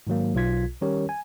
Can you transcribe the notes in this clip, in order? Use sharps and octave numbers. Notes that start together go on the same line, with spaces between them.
G#2 D#3 F#3 A#3
B1 B2 F4 G#6 B6
D#3 G3 C#4 G4 A#4 C#5
G#5